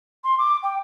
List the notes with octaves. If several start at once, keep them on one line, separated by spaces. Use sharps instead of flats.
C6
D6
G5